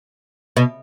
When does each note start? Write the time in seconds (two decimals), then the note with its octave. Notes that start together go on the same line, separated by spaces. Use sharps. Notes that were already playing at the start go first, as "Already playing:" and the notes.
0.57 B2